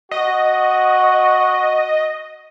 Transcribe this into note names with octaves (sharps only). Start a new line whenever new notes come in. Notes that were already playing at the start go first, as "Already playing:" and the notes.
F#4 D#5